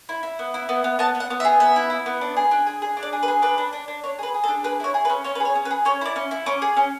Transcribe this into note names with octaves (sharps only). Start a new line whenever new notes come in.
E4
E4
B3
E4
B3
B3
B3 A5
B3
F#5
B3
E5
G#4
B3 E5
E4
E4
B3
D4
G#4
D4
G#4
G#4
D4
D5
G#4
B4
G#4
D4 B4
D4
D4
D4
D4 C#5
G#4 B4
G#4
A4
D4
G#4 B4
E4 C#5
G#4
B4
C#4
C#4 C#5
B4
G#4
C#5
C#4
B4
G#4
C#4 C#5
E4 D5
C#4
E4
C#4 D6
G#4
C#4